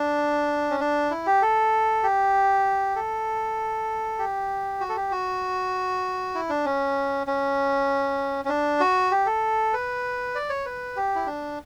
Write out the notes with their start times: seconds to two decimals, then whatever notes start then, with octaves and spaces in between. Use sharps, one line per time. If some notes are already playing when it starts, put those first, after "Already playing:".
Already playing: D4
0.70 C#4
0.80 D4
1.11 E4
1.26 G4
1.42 A4
2.03 G4
2.96 A4
4.19 G4
4.80 F#4
4.89 A4
4.96 G4
5.12 F#4
6.35 E4
6.49 D4
6.65 C#4
7.27 C#4
8.45 C#4
8.49 D4
8.80 F#4
9.11 G4
9.26 A4
9.73 B4
10.35 D5
10.50 C#5
10.66 B4
10.96 G4
11.15 E4
11.26 D4